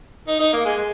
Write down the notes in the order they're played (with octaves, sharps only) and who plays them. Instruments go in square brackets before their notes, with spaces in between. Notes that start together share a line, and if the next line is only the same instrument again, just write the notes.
[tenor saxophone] D#4
D#4
A#3
G#3
G#3